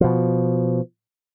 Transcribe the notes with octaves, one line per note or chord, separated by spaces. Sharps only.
B2 F3